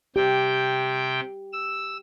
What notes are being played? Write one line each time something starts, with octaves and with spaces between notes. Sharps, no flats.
C3 G4 G5
E6